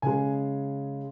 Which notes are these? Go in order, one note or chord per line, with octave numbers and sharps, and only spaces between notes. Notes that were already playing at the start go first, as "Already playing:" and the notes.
C#3 G#3 G#5